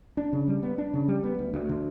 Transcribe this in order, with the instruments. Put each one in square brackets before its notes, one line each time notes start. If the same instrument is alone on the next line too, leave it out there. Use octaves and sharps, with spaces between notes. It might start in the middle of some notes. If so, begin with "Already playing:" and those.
[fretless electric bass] D4
C#3
G3
B3
D4
C#3
G3
B3
D2
D2
D3